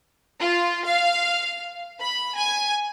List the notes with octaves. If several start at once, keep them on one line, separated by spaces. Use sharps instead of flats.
F4
F5
B5
G#5